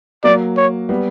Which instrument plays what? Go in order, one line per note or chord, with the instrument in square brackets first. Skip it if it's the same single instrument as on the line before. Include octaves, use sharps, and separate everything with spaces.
[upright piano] F#3 A#3 [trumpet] D5
[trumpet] C#5
[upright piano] G3 B3